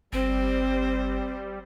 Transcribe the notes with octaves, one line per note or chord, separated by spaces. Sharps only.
G1 G3 C4 C5